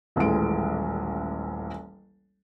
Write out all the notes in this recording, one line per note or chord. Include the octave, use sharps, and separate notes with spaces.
D#1 A1 E3 G#3 D7